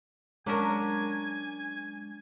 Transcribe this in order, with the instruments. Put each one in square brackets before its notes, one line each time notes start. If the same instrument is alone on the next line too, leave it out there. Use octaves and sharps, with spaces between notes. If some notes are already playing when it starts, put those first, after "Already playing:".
[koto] F#3 C#4 A#4 [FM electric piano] G#3 [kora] D4 [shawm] G#5